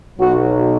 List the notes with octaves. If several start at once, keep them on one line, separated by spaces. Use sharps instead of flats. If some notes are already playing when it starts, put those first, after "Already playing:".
B1 B2 F#3 F#4